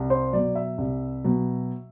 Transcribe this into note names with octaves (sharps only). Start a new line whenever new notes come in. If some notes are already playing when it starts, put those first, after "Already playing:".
Already playing: C2
C5
B2 F#3 D5
E5
C2
B2 F#3